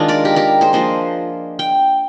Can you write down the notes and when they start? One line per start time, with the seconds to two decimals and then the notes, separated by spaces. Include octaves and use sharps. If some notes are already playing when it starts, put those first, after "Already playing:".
Already playing: D#3 G#3 D4 F4 G#4
0.08 A#4 D5
0.25 G4 A#4
0.36 G4 A#4
0.61 G#4 C5
0.73 F3 A#3 D4 C5 D#5
1.59 G5